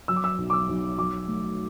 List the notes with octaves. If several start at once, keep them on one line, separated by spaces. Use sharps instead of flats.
F#3 E6
D6
E6
B1
D6
E6
B1
F#3 D6
A3